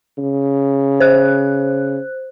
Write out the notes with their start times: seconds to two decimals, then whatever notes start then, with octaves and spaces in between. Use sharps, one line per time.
0.18 C#3
1.00 C5 F#6